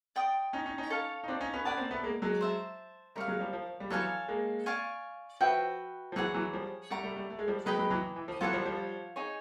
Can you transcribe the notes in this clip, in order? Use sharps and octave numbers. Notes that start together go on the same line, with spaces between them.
D5 G5 C6 D#6
C#4 D#4
C#4 D#4
C#4 D#4
A4 C#5 F5
D#4
C4 D4
C#4 D#4
B3 C#4
B3 C#4 D5 F#5 A5
A#3 C4
A3 B3
G#3 A#3
F#3 G#3
C5 E5 A5
G3 A3 A#4 C#5 F5
F#3 G#3
F3 G3
F3
G3
E3 F#3 A4 C#5 F5 G#5
G#3 A#3
D5 F5 G#5 C#6
F3 F#4 B4 E5 G5
F3
E3 F#3 G#4 C#5 F#5
E3 F#3
F3 G3
G3 A3 D5 F#5 A#5 C#6
G3 A3
G3 A3
A3
G#3
F3 G3
F#3 G#3 B4 D#5 G5 B5
F#3 G#3
E3 F#3
E3
F3
E3 F#3 F4 A4 C#5 F#5
F3 G3
F3 G3
D#4 G#4 C#5